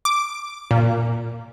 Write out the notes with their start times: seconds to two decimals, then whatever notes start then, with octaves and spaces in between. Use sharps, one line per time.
0.05 D6
0.71 A#2